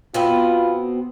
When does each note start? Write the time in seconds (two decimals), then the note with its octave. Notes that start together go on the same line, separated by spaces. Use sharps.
0.14 B2 B3 C4 F4